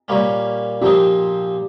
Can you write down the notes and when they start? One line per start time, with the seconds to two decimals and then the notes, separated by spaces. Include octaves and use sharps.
0.08 A#2 G3 A#3 C#4
0.81 A#2 F3 C4 D#4 G4